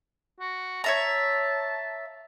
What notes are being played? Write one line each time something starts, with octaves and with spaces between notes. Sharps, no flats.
F#4
C#5 E5 A5 A#5